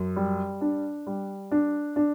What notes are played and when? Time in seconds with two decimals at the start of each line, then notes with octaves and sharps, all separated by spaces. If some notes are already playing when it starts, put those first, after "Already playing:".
Already playing: F#2
0.16 G3
0.61 D4
1.07 G3
1.51 D4
1.96 D4